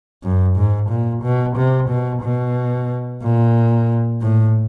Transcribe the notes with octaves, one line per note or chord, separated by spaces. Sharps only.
F#2
G#2
A#2
B2
C3
B2
B2
A#2
A2